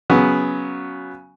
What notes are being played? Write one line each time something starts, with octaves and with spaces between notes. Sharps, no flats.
C#3 F#3 B3